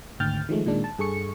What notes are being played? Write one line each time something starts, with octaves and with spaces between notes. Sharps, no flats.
G#1 D2 G5 F6 G6 A6
D#3 F3 G#3 A3
A#2 D#3 G#3 D4
A5
G2 G#4 A4 C#6 C#7